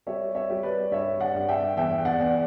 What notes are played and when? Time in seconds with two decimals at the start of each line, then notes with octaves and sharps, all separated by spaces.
0.07 G3 C#5 E5
0.35 C#5 E5
0.50 G3
0.63 B4 D5
0.91 G2 C#5 E5
1.20 D5 F#5
1.35 G2
1.49 E5 G5
1.77 E2 E5 G5
2.05 D5 F#5
2.20 E2